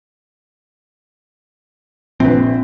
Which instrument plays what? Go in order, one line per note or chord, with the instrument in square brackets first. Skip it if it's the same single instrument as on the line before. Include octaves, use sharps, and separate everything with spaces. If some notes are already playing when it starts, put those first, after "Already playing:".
[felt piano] A#1 B4 [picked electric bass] C4